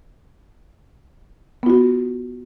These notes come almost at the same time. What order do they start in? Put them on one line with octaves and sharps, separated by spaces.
B3 F4 F#4